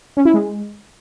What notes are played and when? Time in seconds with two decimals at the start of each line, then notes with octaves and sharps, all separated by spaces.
0.17 C#4
0.25 E4
0.34 G#3